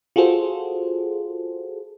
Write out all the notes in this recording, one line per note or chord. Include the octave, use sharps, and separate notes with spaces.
F4 F#4 G#4 A4 C5